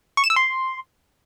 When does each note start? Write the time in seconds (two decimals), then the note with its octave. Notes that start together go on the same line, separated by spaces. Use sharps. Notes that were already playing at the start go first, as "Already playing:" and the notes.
0.17 C#6
0.24 E7
0.30 E6
0.36 C6